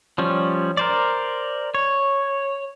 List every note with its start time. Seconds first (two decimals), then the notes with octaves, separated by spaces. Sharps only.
0.18 F3 G3 C#4
0.77 A#4 C5 D5
1.75 C#5